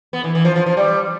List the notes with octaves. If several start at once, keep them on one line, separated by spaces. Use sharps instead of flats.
B3
E3
E3
F3
F3
F3
G3